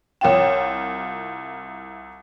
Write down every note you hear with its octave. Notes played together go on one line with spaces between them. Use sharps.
C2 F4 C#5 F5 G5 E7